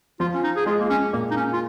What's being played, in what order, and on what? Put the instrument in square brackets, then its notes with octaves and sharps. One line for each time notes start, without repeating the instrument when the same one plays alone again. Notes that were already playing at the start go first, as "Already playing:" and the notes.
[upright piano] F3 [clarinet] F4
[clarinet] C#4
D#4
G#4
[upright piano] G#3 [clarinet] F4
[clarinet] A#3
C#4
[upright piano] A#2 [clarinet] A#3
[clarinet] D#4
C#4
F4